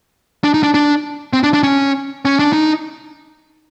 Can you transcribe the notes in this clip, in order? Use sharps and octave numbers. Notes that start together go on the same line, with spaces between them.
D4
D#4
D4
D4
C4
D4
D4
C#4
C#4
D4
D#4